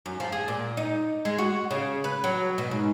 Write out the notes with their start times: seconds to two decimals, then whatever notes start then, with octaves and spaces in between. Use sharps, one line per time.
0.06 F#2
0.20 F3
0.32 G#4
0.48 A#2
0.77 D#4
1.25 G#3
1.38 F#4
1.71 C#3
2.04 B4
2.24 F#3
2.58 B2
2.71 G#2